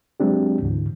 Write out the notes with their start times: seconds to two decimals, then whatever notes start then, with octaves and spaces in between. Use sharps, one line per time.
0.20 F#3 G#3 C4 D4 G4
0.62 D2 G#2 D3 E3